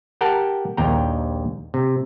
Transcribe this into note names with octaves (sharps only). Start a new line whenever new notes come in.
G4 A#4 F#5 G5 A5
A#1 D#2 G5 A#5
C3